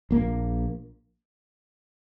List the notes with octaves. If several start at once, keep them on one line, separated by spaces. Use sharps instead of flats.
A#1 A#2 A#3